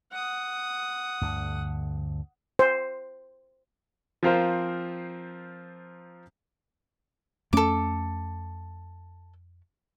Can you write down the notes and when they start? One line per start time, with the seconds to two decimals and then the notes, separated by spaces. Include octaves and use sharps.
0.12 F#5 D#6
1.21 D2 G2 D3
2.59 C5
4.23 F3 C4 F4 A#4 C5 F5
7.53 F2 A3 C#4 A4 D6